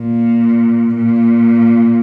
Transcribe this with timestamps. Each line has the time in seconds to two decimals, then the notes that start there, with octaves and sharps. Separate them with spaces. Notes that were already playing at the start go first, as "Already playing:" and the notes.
Already playing: A#2
0.96 A#2